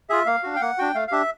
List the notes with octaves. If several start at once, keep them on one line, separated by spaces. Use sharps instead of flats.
F4 G#4 E5
A#3 F5
D4 F#4
G5
A#3 F#5
D4 F#4 G5
A3 F5
F5
D4 G4 E5